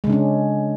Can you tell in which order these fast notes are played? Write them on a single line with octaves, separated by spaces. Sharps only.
G#3 C#3 D4 C#4